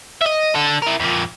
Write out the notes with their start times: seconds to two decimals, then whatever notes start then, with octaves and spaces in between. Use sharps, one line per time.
0.21 D#5 E5
0.54 D3 A4
0.82 E4 A#4
1.00 F2 A#2